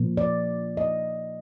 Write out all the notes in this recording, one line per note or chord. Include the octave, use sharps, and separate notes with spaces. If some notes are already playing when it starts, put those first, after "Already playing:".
Already playing: A#2 F3 A#3
D5
D#5